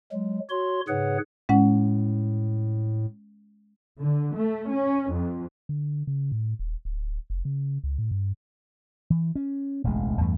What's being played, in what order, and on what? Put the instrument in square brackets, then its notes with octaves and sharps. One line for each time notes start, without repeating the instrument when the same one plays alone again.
[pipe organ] F#3 G#3
F#4 C#5 C6
G#2 C#3 G#4 B4 C#5 F#5
[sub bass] A2 [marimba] G#3 C#4 F#5
[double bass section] D3
A3
C#4
F2
[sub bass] D3
C#3
A2
D#1
D1
F1
C#3
C#2
A2
G2
[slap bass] E3
C#4
E1 A1 D2 G#3
E2 G2 A3